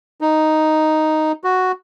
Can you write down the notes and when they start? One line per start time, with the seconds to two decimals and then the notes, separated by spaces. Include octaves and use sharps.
0.21 D#4
1.44 F#4